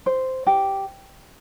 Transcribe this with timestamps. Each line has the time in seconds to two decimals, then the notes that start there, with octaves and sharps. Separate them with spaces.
0.06 C5
0.47 G4